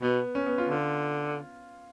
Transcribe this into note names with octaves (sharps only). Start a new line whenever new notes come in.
B2 B3
C#4
B3
F4
D3 F4